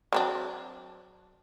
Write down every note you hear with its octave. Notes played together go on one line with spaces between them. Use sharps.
F#3 C4 D4